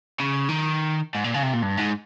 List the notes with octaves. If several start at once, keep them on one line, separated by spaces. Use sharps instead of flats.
C#3
D#3
G#2
A#2
C#3
C3
A#2
G2
G#2